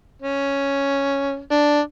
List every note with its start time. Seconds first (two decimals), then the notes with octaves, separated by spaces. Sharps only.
0.22 C#4
1.51 D4